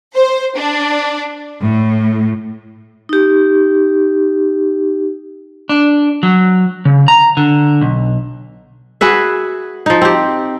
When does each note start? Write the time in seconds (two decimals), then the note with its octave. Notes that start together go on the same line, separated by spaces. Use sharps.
0.16 C5
0.58 D4
1.62 A2
3.09 D#4 G4
5.69 D4
6.23 F#3
6.85 C#3
7.08 A#5
7.37 D3
7.81 B1
9.01 F#4 G#4 B4 E5
9.86 F3 D#4
10.01 C4 G4